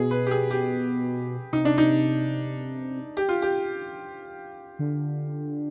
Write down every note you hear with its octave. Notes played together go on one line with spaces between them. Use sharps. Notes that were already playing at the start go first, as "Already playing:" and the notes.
Already playing: B2 G#4
B4
G4
G#4
G4
C3 D#4
D4
D#4
G4
F4
G4
D3